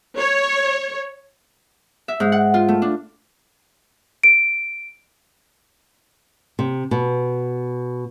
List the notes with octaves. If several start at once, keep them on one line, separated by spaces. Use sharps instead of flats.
C#5
E5
G#2
F#5
F4
A3
D4
D7
C3
B2